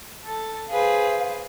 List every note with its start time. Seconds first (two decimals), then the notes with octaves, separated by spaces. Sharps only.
0.23 A4 A5
0.69 G#4 B4 C5 F5